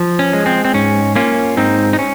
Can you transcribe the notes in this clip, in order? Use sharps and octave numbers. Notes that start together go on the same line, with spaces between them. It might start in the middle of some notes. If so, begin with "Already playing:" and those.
Already playing: F3
C#4
G#3
C4
C4
G#2 C#4
A#3 C#4 F4
G#2 C4 D#4
D#4
C#4